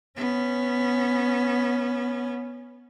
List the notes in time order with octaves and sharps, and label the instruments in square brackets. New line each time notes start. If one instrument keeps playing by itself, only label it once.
[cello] B3 C#4